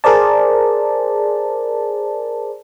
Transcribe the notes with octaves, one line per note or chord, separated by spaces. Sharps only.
G#4 A#4 C5 D5 A5